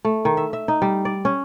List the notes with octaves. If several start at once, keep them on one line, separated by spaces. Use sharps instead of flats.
A3
D#3
E5
E5
D#4
G3
D5
C#4